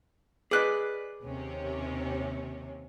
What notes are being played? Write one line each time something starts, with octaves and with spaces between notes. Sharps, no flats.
G#4 B4 D5 D#5 F#6
D#2 C3 C#4